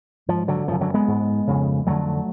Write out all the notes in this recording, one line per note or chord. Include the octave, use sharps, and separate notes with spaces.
G#2 F3
D3 F#3
F#2 C#3 F3
D3 F#3
G#3 B3
G#2
F2 C#3
F2 D3 F#3 A3